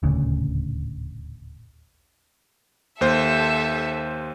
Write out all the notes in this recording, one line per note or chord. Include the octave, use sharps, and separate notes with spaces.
D#1 A1 D2 C#3
D#2 A4 C5 E5